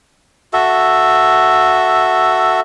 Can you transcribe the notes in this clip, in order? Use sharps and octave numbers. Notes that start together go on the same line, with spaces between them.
F#4 A4 E5